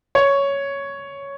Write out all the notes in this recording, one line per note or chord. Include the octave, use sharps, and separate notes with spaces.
C#5